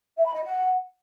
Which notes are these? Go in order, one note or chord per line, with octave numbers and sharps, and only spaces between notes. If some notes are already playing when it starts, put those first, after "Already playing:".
E5
B5
D#5
F#5